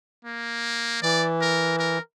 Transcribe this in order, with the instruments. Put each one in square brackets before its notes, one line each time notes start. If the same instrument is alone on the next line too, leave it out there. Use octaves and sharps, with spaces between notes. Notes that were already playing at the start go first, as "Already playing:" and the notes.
[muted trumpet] A#3
[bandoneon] E3 [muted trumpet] D5
[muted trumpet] A#4
A#4